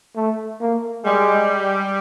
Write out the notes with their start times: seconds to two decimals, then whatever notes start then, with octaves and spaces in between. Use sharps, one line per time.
0.16 A3
0.61 A#3
1.04 G3 G#3